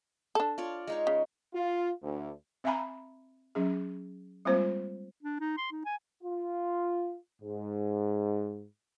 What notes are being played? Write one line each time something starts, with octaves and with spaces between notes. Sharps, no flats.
D4 A4
F4 C#5 D5
G#3 D#4 C#5
C#3
F4
D2
C4 E5 F5 G#5 A#5 B5
F#3 C#4 G#4
G3 G#3 A#3 C4 F4 C5
D4
D#4
C6
D#4
G#5
F4
G#2